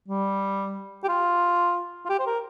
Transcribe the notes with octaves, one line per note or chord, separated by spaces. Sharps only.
G3
G4
F4
F4
G4
C5
A#4